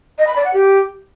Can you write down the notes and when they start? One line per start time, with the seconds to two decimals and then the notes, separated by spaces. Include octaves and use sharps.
0.18 D#5
0.27 B5
0.36 D5
0.45 F#5
0.54 G4